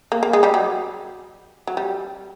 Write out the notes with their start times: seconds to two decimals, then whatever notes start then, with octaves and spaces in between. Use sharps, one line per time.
0.12 A#3
0.23 A#3
0.33 G#3
0.43 G3
0.54 F#3
1.67 F#3
1.77 G3